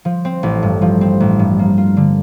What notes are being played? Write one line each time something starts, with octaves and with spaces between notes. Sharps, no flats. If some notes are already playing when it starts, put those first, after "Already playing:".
F3
C4
A1
G2
F3
C4
A1
G2
A#3
F4
D3